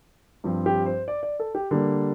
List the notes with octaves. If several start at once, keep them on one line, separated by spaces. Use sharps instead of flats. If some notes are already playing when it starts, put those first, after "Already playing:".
G2 F3 C4
G4
C5
D5
D5
A4
G4
D3 G3 A#3